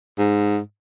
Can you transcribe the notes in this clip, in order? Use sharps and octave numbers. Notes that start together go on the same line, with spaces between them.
G#2